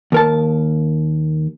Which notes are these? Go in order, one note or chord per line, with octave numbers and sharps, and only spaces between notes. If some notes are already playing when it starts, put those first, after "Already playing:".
D#2 A#4 A5